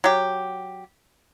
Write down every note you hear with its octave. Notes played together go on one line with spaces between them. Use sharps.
F#3 G4